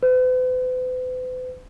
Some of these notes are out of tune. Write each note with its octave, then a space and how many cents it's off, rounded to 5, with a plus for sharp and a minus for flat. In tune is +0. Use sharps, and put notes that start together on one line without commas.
B4 +45